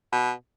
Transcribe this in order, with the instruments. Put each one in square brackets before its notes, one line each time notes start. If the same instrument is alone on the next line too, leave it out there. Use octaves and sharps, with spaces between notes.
[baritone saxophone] B2